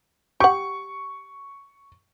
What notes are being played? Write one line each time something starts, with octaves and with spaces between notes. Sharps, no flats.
G4 F#5 C#6